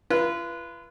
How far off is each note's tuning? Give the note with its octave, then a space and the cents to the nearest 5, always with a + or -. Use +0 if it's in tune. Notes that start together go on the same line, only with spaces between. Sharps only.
F4 -40 B4 -20